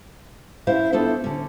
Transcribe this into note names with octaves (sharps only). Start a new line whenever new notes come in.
C#4 E4 C5 F5
B3 D4 E4 F4 A4 C5
D3 C#4